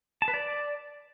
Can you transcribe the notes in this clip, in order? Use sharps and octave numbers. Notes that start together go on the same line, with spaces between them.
A5
B4
D5